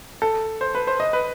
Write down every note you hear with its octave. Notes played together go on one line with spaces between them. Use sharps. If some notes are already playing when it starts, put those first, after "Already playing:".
A4
C5
B4
C5
D#5
B4